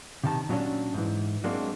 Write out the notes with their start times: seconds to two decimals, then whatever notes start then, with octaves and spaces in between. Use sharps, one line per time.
0.24 C3 D#3 A5
0.49 A#2 F#3 C#4 D4
0.94 G#2 E3
1.44 F#3 G#3 A#3 C4 D4